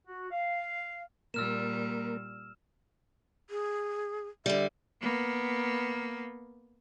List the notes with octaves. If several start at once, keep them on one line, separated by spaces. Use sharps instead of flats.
F#4
F5
A#2 G3 A#3 A#4 E6 F6 E7
G#4
D3 G3 E5
A#3 B3